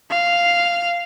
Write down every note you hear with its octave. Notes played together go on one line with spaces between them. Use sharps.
F5